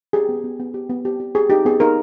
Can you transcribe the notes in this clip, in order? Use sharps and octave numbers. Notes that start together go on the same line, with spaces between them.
G4 G#4
B3
B3
B3
G4
B3
G4
G4
G4 G#4
D#4 G4
B3 G#4
D#4 A#4